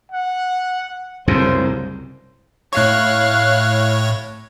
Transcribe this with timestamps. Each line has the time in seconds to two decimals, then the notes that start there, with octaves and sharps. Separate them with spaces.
0.11 F#5
1.28 C2 F#2 C#3 C5
2.73 A2 C#5 F5 F#6